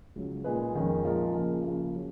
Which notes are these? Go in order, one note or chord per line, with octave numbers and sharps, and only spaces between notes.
C#2 C#3 F#3
A#2 G#3 D#4 G#4 B4
F2 D#3 G#3 C#4
A#2 F3 G#3 D#4 A#4
C#3 F3 A#3
C#3 F3 A#3
F#3